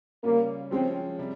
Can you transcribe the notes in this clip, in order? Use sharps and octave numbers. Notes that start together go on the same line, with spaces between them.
C#3 G3 A#3 C#4
F3 G#3 C4 C#4
C3 G3